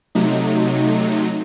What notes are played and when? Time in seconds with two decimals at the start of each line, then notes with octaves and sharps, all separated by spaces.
0.15 C3 F#3 A3 D#4